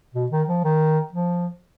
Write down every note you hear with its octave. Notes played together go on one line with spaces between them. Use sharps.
B2
D#3
F3
D#3
F3